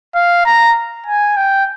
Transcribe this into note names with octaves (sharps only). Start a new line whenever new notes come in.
F5
A#5
G#5
G5